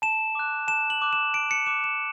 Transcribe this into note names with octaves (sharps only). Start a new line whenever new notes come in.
A5 E7
D6 F#6
A5 E7
F#7
D6 F#6
E7
A5 D7
C#7
D6 F#6 E7
E7